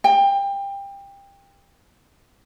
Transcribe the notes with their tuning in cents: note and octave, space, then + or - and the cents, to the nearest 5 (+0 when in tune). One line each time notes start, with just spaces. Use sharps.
G5 +25